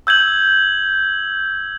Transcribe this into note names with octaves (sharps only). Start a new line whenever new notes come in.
E6 G6 G#6 F#7